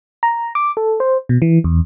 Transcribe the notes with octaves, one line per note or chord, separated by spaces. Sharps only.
A#5
D6
A4
C5
B2
E3
E2